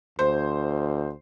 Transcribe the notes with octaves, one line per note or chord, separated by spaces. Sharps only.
D2 C5